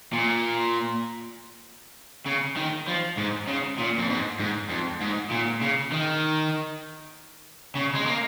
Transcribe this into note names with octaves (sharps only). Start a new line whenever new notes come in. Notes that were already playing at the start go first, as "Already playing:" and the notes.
A#2
C#3
D#3
F3
G#2
C#3
A#2
F2
G#2
G#2
F2
G#2
A#2
C#3
D#3
C#3
G#3
A#3